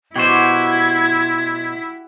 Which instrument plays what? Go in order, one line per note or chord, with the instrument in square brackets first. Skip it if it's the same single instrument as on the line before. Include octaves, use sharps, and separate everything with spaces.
[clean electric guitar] B2 C5 [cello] E4 [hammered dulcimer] F#4 G4 [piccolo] G#6